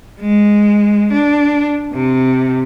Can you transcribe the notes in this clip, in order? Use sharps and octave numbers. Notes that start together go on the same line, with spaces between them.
G#3
D4
C3